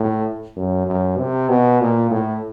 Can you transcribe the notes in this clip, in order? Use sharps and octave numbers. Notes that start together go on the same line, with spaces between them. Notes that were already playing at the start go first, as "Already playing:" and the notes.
Already playing: A2
F#2
F#2
C3
B2
A#2
A2